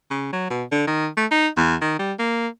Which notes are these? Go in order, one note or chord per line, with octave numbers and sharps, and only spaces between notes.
C#3
F#3
B2
D3
D#3
A3
D#4
E2
D#3
G3
A#3